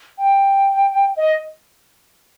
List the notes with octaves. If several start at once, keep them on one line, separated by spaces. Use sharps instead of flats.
G5
D#5